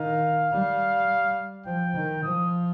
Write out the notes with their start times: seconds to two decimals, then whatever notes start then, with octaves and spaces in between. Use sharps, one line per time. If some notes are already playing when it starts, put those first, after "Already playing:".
Already playing: D#3 F5
0.51 G3
1.66 F3 G5
1.95 D#3
2.23 F3 D#6